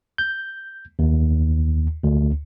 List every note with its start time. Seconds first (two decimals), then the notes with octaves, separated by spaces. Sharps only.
0.18 G6
0.99 D#2
2.03 D2